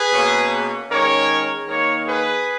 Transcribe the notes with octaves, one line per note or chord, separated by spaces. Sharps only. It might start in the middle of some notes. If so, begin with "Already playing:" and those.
Already playing: G#4 B4
B2 A#3 C#4
D#3 G#3 C#4 A#4 C#5
D#3 A#3 D#4 A#4 C#5
G#4 B4